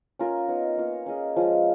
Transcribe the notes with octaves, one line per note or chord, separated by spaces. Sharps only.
C#4 F4 A#4
B3 D#4 A#4 C#5
A#3 F4 A#4 C#5
C#4 G#4 D#5
F3 G#3 C#4 F4